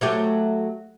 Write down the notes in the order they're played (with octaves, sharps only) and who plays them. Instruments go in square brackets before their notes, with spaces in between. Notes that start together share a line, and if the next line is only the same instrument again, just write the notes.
[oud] F#3 A3 G4